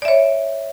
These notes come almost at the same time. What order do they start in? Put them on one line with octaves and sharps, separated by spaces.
D5 E5 C#5